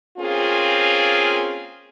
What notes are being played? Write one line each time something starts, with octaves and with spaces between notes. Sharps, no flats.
A#3 C4 C#4 F4 G#4